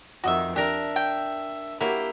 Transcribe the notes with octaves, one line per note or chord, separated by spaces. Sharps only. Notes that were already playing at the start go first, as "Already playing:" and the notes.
F2 D#3 F#4 D#5 E5
D4 G4 A#4 E5
G5
F#3 A#3 E4 G4